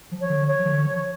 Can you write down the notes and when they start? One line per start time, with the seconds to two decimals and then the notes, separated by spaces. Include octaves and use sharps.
0.12 F3
0.21 C#5
0.30 D3
0.48 C#5
0.59 F3
0.66 D3
0.85 F3